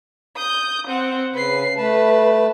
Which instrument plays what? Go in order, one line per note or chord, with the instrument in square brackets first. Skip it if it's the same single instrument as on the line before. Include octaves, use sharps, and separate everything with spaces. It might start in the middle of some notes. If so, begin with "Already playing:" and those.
[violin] D#6 G6
C4 F#5
[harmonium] C#3 [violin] B4 C7
[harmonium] A3 A5 [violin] B4